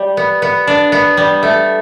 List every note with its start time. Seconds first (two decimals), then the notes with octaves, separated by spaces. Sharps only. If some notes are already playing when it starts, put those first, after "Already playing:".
Already playing: G3
0.17 B3
0.42 B3
0.67 D4
0.92 B3
1.17 G3
1.43 A3